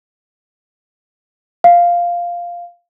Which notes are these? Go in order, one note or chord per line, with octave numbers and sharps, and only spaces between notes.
F5